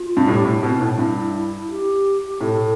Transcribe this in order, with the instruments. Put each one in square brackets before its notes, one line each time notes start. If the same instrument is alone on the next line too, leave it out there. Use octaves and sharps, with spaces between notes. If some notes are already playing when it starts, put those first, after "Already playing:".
Already playing: [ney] F4
[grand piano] G2
[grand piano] A2 [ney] G4
[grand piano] A2 [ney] E4
[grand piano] B2 [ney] C4
[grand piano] A2 [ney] E4
[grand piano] G2 [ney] E4
[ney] E4
G4
[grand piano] A2 [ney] A4